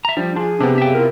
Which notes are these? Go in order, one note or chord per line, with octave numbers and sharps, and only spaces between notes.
E5 A#5
F3 G3 D4
D4 F4 G#4
C3 B3 D4 G4
F#2 C#3 E5 G5
E4 F4 A#4